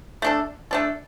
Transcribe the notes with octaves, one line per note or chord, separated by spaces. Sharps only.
A3 D4 A4
A3 D4 A4